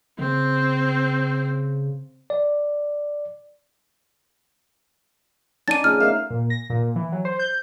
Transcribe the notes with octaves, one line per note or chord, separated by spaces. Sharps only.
C#3 C4
D5
C#4 D#4 D5 G#5 A5 A6 D#7
A3 C#4 F4 G#4 D#5 F6
A3 B3 A#4 E5 F5
A#2
A#6
A#2
E3
F#3
C5
G6